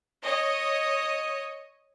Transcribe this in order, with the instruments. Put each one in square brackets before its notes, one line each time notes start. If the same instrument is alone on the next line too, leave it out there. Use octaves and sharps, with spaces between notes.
[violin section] C#5 D#5